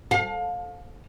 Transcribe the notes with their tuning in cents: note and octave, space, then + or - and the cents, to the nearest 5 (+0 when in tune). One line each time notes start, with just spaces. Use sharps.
F5 +30